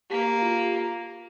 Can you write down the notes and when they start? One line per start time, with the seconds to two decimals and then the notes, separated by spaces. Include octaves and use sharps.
0.11 A#3 G4
0.26 G4
0.42 F4